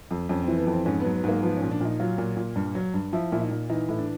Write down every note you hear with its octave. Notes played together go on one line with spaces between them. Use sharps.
F2
F2 C#4
E3 C4
B3
F2
C4
G#2 C#4
F#3 B3
B3
G#2 A#3
F3 B3
A#2 C#4
D4
A#2 D#4
F#3 F4
A#2
A#2
G2
F#3
G2
F3 E4
A#2 E4
D#4
A#2
E3 D#4
A2
D4